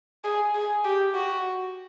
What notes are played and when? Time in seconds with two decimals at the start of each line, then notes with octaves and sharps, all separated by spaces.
0.24 G#4
0.55 G#4
0.84 G4
1.14 F#4